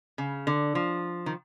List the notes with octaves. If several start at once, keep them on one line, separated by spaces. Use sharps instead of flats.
C#3
D3
F3
D#3